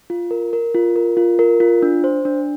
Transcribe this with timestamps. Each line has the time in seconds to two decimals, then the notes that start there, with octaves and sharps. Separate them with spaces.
0.10 F4
0.31 A#4
0.53 A#4
0.74 F4
0.96 A#4
1.17 F4
1.39 A#4
1.60 F4
1.82 D4
2.04 C5
2.25 D4